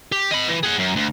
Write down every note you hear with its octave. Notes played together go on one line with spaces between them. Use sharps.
G4
D#5 B5
E3
G#4 F#5
F#2
D2